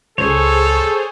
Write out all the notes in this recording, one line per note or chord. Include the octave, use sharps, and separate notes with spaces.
C#2 G#4 A4 C5 C#5